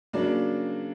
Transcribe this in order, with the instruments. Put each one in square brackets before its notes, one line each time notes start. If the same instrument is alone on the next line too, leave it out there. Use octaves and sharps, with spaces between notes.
[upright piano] C#3 F#3 A#3 D4 D5